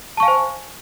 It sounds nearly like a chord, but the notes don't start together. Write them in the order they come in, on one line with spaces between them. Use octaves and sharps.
A5 C#6 F5 G#5 C5